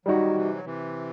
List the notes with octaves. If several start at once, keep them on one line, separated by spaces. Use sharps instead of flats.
D#3 F#3 G3 D#4 F#4
C3 E3
F#3
C3 E3